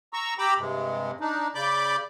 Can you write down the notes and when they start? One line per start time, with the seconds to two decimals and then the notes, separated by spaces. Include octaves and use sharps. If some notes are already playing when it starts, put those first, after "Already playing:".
0.13 A#5 C#6 E6
0.39 G4 G5 A#5 B5 D6 E6
0.58 G2 C3 G#3
1.21 D4 D#4
1.55 C#3 D5 B5 D6 G6